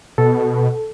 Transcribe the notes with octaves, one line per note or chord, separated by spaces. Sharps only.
B2 A4